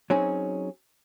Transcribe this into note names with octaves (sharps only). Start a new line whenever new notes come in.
F#3 C4 C#4 D#4 G#4